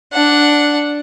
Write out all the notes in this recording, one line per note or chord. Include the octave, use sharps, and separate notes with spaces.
D4 F#5